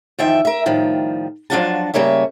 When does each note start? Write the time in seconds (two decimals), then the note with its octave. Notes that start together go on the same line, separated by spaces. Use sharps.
0.19 E2 D#3 F3 E5 G5
0.45 A#4 E5
0.66 A2 D#3 F3 G3
1.50 F3 F#3 D4 F4 F#4 A5
1.94 C#3 G3 A#3 C#5 E5